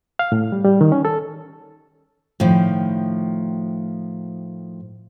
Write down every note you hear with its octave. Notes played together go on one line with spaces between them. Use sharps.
F5
A2
G3
G3
D#3
C#4
A4
A2 D#3 F3